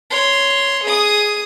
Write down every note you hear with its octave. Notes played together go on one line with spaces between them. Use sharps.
C#5 C6
G#4 D#6